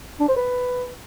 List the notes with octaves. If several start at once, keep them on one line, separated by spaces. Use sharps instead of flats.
D4
C5
B4